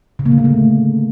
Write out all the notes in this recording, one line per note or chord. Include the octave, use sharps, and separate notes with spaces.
C#3
A#3
D3
A#3
A3